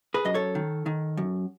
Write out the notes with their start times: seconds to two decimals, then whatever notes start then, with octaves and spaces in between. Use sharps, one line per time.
0.14 G#4 B4
0.25 F#2 D#5
0.35 A4 C#5
0.55 D#3
0.86 D#3
1.17 F#2